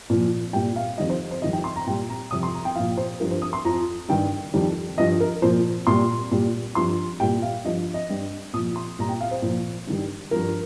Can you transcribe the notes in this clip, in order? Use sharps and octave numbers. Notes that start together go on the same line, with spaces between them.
A#2 F3
A#2 G3 G5
F5
F2 D#3 G3 D#5
C5
C5
F2 D#3 G3 D#5
G5
C6
A#5
A#2 G3 G5
A#5
F2 C3 G3 D#6
C6
A#5
G5
A#2 F3 F5
C5
G2 F3 A#4
C5
D#6
C6
F2 F3 A#5
G2 D#3 G3 G5
F2 D#3 G3
G2 F3 D#5
A#4
A#2 F3 C5
A#2 G3 C6
A#2 G3
G2 F3 C6
A#2 G3 G5
F5
G2 F3 D#5
D#5
G2 G3
A#2 F3 D#6
C6
A#2 G3 A#5
G5
F5
C5
A#2 F3
G2 D#3 G3
G2 F3 A#4